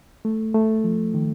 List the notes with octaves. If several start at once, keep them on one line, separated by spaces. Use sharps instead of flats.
A3
A3
F3
D#3